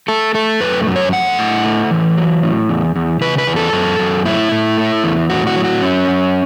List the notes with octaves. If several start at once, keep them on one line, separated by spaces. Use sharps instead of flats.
A3 A4
A3 A4
F#2 B4
F#2
C#5
A3 F#5
A2
A3
E3
F#3
A2
E2
E2
C#3 B4
B4
E2
A4
F#2
F#2
A2 E4
A2
A3
E2
A2 F#4
F#4
F#3
F#4
F#2 C#4
F#2